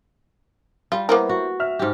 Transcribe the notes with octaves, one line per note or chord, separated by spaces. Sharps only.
G3 F4
A#3 B3 E4 A#4 C5
F#4
E5 F6
G#2 G4